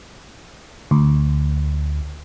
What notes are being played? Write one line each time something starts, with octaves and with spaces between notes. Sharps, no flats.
D2